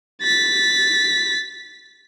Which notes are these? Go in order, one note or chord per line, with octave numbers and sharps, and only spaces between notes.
A6 B6